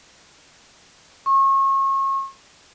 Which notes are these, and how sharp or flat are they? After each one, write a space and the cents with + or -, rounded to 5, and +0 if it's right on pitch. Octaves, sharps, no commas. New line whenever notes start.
C#6 -35